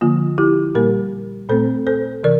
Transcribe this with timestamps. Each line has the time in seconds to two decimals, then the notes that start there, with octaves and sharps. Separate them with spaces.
0.01 D3 F3 A#3 F4
0.38 E4 G4
0.75 A#2 G3 A#3 G4 A#4
1.49 A#2 A3 C4 A4 C5
1.87 A4 C5
2.24 C3 E3 A#4 D5